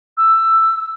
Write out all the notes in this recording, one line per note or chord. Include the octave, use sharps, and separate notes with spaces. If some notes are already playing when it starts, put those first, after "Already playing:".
E6